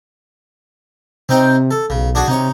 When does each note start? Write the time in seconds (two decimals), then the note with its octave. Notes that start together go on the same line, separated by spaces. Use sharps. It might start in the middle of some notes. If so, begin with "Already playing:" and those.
1.29 C3 C4 D#4 G5
1.71 A4
1.90 B1 C#3
2.15 D4 F#4 G#4
2.28 C3 D#4 C#5